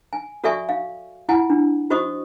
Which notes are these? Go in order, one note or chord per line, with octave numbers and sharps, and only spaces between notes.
G#5
F#4 A4 D5 E5 G#5 C#6
F5
E4 F4 F#5 G#5
D4
F#4 C5 D#5 C#6 D#6